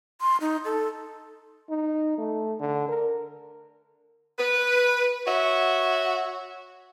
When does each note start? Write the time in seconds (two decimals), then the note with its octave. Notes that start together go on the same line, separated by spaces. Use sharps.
0.21 C6
0.41 D#4
0.65 A4
1.69 D#4
2.18 A3
2.60 D3
2.88 A#4
4.39 B4
5.27 F#4 C#5 E5